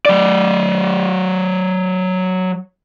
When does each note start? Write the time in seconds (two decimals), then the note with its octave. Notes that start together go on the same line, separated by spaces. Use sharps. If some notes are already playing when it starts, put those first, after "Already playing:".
0.06 F#3 D5